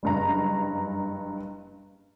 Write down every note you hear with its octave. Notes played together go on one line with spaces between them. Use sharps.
F#1 G2 A#5